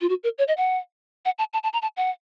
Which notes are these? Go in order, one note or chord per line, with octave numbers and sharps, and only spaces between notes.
F4
F#4
A#4
C#5
D#5
F#5
F#5
A5
A5
A5
A#5
A5
F#5